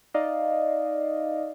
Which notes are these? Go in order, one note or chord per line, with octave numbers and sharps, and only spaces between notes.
D#4 D5 D#5 F5